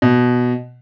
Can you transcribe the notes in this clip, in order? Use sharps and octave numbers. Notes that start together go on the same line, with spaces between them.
B2